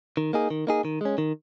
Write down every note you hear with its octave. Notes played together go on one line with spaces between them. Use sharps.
D#3
A#3 D#4 G#4
D#3
A#3 D#4 G#4
D#3
G#3 C#4
D#3